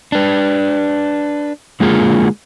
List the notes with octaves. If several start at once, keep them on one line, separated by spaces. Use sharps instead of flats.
D4 B4
D3 G#3 A#3 F4 G#4 A#4